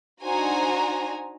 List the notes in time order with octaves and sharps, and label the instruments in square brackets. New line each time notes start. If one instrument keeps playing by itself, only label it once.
[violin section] D4 D#4 F#4 C5 G#5 A#5